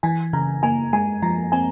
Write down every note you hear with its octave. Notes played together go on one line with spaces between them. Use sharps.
E3 G#5
C#3 A#5
A#3 G#5
G#3 G#5
F3 A#5
C4 G#5